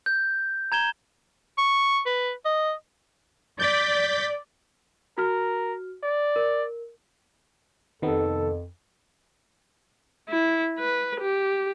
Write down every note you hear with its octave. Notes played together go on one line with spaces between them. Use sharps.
G6
A#5 G#6 E7 G7
C#6
B4
D#5
D5 G6 A6 B6
F#4 A#4 F6
D5
A#4
F2 C3 D#3 B3 A4
E4
B4
G4